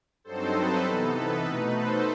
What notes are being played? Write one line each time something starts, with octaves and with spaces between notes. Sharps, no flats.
G2 F#3 C4 D#4 A4 C5
B4
C3 E3 B3 D#4 A4
B4
B2 A3 D#4 B4
A4 C5